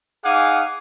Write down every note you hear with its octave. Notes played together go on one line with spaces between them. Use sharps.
D#4 G#4 F5 F#5 G#5 D6